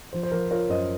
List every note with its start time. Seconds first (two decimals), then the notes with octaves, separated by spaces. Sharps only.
0.13 F3 C5
0.23 C5
0.32 F3 A#4
0.51 F4 A#4 C#5
0.69 F#2 C5 D#5